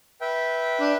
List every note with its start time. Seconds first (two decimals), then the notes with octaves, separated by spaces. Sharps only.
0.21 B4 E5 G5
0.81 D4